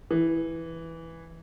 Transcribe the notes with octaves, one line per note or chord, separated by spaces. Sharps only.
E3